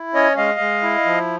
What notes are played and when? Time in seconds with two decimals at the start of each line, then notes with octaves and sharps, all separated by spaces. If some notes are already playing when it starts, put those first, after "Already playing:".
Already playing: E4
0.14 C#4 C#5 D#5
0.37 G#3 D#5 F5
0.60 G#3
0.83 E4
1.05 F3